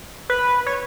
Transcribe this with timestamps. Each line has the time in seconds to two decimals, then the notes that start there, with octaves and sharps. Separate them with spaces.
0.30 B4
0.66 C#5